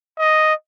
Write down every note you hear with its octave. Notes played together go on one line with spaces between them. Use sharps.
D#5